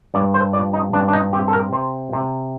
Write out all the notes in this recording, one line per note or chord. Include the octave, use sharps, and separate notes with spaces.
G2 D5
C5
F3 D5
D#4
G2 D4
D4
D#4
C4 G4
A4
A#4
C3 C5
C3